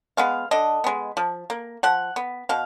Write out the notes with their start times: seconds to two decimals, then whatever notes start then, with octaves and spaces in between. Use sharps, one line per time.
0.17 G#3 B3 F5
0.51 D3 D#5
0.84 G#3 B3
1.17 F3
1.50 A#3
1.83 F3 F#5
2.16 B3
2.49 B2 F5